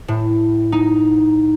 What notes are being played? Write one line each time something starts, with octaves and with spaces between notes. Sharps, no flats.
A2
D#4